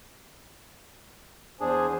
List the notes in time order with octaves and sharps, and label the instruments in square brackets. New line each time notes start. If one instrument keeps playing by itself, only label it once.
[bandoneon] E2 D4 G#4 [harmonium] C5 G#5